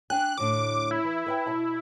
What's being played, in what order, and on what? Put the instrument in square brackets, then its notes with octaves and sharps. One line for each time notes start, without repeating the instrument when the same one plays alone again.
[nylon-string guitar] D4 G5 G#5 [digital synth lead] F#6
[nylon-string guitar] D2 A2 D4 [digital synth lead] D6
[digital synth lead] E4
[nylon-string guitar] E3
B4 E5 G5
B2 A5